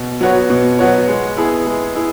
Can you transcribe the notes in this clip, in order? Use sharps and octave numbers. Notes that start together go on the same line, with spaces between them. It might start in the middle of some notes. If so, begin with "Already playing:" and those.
Already playing: B2
F#3 B3 F#4 C#5
B2
F#3 B3 F#4 C#5
G#3
B3 E4 G#4
G#3
E4 G#4